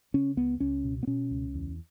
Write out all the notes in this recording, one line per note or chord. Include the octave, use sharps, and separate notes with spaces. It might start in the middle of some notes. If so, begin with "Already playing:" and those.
C#3 C#4
C#2 B3
C#2 C#4
B2
B3
B2 C#4
C#2
E2